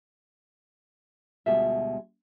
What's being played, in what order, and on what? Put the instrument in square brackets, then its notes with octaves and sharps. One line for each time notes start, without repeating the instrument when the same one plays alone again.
[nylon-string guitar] D2 B2 G3 G#3 F4 E5